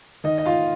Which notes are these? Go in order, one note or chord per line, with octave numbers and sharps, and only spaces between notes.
D#3 D#4 D#5
D#5
F4 F5